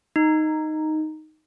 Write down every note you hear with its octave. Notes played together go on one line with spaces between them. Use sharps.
D#4